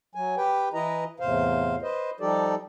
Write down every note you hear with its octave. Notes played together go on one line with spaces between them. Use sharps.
F#3 G#5
G4 B4 G5
E3 E4 B4 D#5 A#5
E2 A2 C3 C5 F5
B4 C5 D#5
F3 G3 D#4 G4 A4 D5